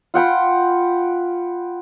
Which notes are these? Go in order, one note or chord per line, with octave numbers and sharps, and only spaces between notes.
F4 F#5 G5 B5